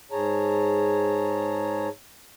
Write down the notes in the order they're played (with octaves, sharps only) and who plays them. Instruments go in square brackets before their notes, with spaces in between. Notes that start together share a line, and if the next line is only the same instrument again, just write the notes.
[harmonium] G#2 G#4 C#5 A5 A#5